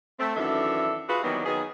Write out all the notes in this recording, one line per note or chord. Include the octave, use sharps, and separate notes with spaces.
A3 C4
F#2 D#3 E3 D4 A4 E5
F4 F#4 G#4 B4
D#3 E3 F#3 G3 A#3 B3
D#3 F#3 B3 G#4